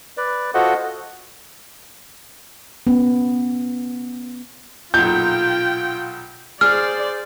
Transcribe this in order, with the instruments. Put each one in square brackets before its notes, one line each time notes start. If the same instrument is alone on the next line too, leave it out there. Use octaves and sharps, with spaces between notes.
[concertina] B4 D5
F4 F#4 A4 C5 D#5 F#5
[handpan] B3 C#4
[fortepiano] B1 A#2 [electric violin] F4 G5 [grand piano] G6
[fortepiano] G#4 [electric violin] C5 D5 [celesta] F6